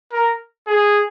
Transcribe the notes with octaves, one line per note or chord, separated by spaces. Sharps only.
A#4
G#4